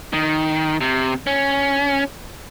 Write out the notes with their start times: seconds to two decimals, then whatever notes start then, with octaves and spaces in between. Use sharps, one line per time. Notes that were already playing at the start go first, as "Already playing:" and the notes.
0.13 D#3
0.81 C3
1.27 C#4